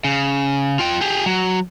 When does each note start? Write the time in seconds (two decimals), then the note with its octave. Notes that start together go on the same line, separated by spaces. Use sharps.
0.05 C#3
0.79 F4 G5
1.01 G4 G#4
1.26 F#3